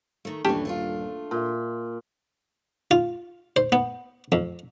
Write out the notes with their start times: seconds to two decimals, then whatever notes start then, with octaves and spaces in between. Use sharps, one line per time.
0.25 D#3 A3
0.45 D#1 G2 E3 A3 C#4 D4 G4 A5
0.65 A3 D4 F4
1.31 A#2 A#4 E5
2.91 F4
3.56 C5
3.72 B3
4.32 F2